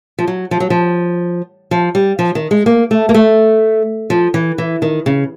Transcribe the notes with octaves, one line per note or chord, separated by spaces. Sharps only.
F3
F#3
F3
F#3
F3
F3
G3
F3
D#3
G#3
A#3
A3
A#3
A3
F3
E3
E3
D#3
C#3